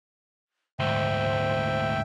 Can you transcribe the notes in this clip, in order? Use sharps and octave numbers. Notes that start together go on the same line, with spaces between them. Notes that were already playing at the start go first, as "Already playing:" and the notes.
D2 G#2 C5 E5 G5